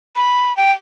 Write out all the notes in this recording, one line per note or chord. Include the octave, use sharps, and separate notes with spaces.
B5
G5